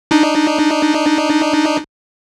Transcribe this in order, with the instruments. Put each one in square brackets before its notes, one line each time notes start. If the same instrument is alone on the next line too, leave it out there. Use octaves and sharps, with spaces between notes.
[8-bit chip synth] D4 D#4